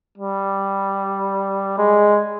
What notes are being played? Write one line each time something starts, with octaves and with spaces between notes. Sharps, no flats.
G3
G#3